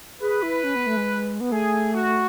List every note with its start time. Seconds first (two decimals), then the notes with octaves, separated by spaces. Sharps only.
0.21 G#4 B4
0.42 E4
0.64 C#4
0.75 B3
0.86 A3
0.97 G#3
1.40 B3
1.51 A3 G#4
1.94 F#4